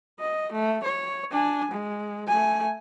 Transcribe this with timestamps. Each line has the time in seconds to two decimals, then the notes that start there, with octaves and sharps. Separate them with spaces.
0.19 D#5
0.52 A3
0.84 C#5
1.31 D4 G#5
1.72 G#3
2.28 A3 G#5